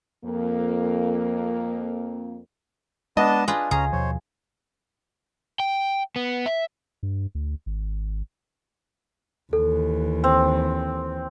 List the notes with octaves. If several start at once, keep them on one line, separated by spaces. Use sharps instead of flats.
F2 A#3
G#3 B3 D4 D#5 A5
D4 F4 G#4 B4
C#2 C#3 C#4 G#4 A#5
D#2 B2 F3 C5 C#5
G5
B3
E5
G2
D2
G#1
D#2 E3 A4
C4